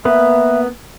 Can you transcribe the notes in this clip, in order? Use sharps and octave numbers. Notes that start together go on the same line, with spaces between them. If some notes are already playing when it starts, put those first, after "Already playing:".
A#3 B3 B4 E5